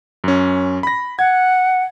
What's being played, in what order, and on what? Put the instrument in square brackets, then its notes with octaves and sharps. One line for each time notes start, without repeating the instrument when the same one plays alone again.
[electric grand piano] F#2 C#4
B5 A#6
[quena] F#5 [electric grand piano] G#6